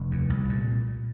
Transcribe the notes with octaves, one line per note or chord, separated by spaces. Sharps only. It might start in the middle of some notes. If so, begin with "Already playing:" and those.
Already playing: F1 A3 C4
D#2
C2
A#2